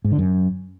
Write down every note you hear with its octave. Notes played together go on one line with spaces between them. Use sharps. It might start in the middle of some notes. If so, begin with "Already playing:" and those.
G#2
D3
F#2